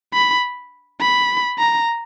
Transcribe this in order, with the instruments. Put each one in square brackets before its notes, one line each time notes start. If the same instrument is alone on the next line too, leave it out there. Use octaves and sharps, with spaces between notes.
[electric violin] B5
B5
A#5